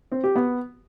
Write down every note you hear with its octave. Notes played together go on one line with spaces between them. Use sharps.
C4
G4
B3